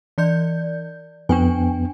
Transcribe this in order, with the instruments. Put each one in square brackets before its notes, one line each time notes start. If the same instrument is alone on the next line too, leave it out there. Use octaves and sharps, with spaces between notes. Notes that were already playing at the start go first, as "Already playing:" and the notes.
[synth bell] E3 D5 G6
[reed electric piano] F2 B3 [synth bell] D4 G5 G#5